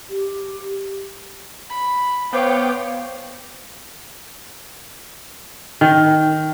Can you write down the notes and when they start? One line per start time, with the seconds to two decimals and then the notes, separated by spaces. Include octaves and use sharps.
0.10 G4
1.69 B5
2.33 B3 C5 C#5 F5 G5 D6
5.81 D#3